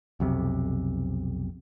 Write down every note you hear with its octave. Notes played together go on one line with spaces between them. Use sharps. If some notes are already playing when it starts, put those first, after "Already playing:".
B1 F2 C3